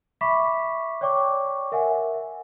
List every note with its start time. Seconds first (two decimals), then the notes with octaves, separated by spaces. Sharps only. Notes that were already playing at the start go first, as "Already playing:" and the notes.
0.21 E5 B5 C#6 D6 B6
1.01 C#5 D5 G5 C#6 D6
1.72 A#4 E5 F#5 G#5